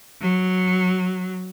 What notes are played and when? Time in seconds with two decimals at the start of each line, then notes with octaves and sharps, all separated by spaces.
0.21 F#3